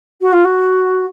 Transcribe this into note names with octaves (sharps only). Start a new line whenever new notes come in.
F#4
F4
F#4